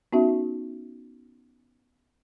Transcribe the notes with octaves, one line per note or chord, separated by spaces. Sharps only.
B3 C#4 D#4 F#4 E5